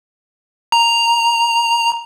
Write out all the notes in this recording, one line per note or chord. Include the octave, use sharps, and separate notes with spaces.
A#5